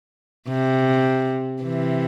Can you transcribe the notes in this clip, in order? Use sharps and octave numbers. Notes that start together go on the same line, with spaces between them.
C3
C3 E3